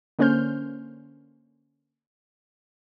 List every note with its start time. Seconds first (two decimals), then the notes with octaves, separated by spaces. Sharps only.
0.19 D3 A#3 C#4 C5 F6 G6